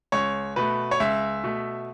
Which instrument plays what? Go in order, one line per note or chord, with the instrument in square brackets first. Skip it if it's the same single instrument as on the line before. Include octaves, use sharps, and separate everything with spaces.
[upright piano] C#2 C#5
B2 A3 B4
C#5
C#2 E5
B2 A3